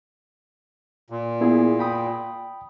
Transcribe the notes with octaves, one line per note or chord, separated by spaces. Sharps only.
A#2
B3 E4 G#4
G5 B5 D#6